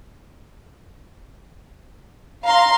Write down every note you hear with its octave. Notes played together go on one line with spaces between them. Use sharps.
F5 A#5 C6